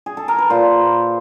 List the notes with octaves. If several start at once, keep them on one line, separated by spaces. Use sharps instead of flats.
G#4
A4
A#4
B4
A#2 C5